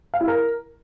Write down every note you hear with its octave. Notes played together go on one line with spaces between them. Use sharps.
F5
E4
A#4